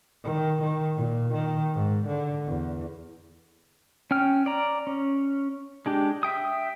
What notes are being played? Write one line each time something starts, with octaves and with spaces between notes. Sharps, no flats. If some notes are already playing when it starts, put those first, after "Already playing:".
D#3
D#3
A#2
D#3
G#2
D3
E2
C#4 G5 F6
D5 A#5
C#4
G#3 D4 G4
E5 G5 D#6